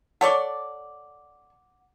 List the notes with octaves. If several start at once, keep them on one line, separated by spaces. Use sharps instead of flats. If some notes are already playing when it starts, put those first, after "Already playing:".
A4 C#5 D5 F#5 D6